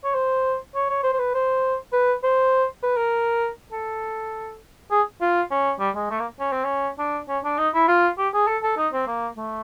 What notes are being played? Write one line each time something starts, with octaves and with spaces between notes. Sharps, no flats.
C#5
C5
C#5
C#5
C5
C5
B4
C5
B4
C5
B4
A#4
A4
G#4
F4
C#4
G3
G#3
A3
A#3
C#4
C4
C#4
D4
C#4
D4
D#4
E4
F4
G4
G#4
A4
A4
D#4
C4
A#3
A3